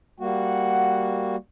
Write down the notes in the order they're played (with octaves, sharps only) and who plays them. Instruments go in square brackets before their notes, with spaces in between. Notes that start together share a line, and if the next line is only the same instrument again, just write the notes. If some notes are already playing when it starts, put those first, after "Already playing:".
[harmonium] G3 A#3 F#4 [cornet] F#5